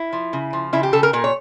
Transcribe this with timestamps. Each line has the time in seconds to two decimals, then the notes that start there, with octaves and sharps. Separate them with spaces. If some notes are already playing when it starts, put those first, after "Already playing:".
Already playing: E4
0.13 F3
0.33 C#3
0.53 F3
0.73 C#3 E4
0.83 G4
0.93 C#3 A4
1.03 A#4
1.13 A#2 A#4
1.24 C#5